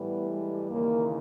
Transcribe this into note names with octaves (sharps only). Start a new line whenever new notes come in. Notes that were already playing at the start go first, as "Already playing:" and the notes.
Already playing: A2 E3 G3 B3
G#3
D#2 C#3 E3 A#3